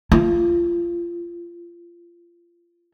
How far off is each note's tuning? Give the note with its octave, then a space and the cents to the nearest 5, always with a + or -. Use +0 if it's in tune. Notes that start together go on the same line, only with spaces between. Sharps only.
F4 -25